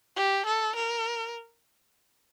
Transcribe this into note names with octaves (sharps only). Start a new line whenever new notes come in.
G4
A4
A#4